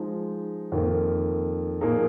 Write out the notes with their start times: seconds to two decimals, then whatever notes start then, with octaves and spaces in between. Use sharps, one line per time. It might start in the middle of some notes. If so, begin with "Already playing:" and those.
Already playing: F3 G#3 D#4 G#4 C5
0.72 F2 D#3 A#3
1.81 A#2 F3 A#3 D#4 G#4